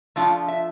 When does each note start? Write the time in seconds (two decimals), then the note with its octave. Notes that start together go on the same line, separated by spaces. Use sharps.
0.16 F3 A3 D4 F4 F5
0.48 E5